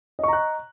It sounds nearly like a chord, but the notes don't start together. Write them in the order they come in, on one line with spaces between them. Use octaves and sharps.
D#5 C#6 A#5 F#6